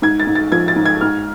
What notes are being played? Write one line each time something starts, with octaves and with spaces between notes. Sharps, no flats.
G#2 G#6
A6
G#2
A6
F3 G#6
A6
G#2
G#6
G#2 F6